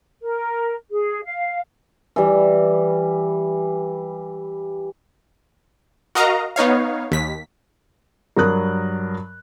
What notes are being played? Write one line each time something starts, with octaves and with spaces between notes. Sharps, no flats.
A#4
G#4
F5
E3 G3
F#4 A#4 D#5 F5 A#5
B3 D#4 C#5 F5
D#2 B6
G2 F#3 A#4 D#6 F#6